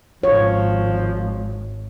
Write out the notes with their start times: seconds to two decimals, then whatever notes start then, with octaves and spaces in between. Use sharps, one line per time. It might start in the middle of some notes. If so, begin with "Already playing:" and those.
0.23 G#1 F3 C#5